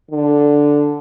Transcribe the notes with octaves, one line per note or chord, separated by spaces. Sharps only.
D3